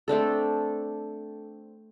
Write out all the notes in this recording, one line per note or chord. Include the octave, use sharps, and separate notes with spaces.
A3 C4 D4 A4